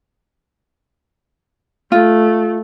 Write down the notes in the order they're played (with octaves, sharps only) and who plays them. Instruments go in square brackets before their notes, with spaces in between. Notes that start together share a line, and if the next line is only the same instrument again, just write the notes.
[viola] A3 [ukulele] F4